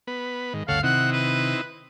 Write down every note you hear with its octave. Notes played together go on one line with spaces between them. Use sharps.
B3 B4
G#2 D#3
G1 D2 C#3 A4 C#5 F5 F#5
C3 D#3 C4 D#4 E4 F#5
B4